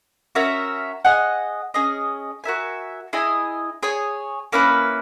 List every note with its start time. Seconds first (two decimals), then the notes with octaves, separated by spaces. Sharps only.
0.35 C#4 F#4 A#4 E5
1.05 G#4 D#5 F#5
1.74 C#4 G#4 D#5
2.44 F#4 A#4 E5 G#5
3.13 E4 G#4 D#5 G#5
3.83 G#4 C#5 G#5
4.52 A#3 C#4 E4 B4